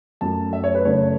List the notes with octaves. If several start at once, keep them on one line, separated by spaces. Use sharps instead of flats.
F#2 F#3 A3 A5
E5
C#5
B4
F#2 C#3 A3 C#5